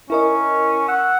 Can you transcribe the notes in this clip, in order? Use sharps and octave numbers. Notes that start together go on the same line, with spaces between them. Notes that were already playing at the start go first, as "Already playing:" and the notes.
C#4 E4 A#4 D#5
F#5 E6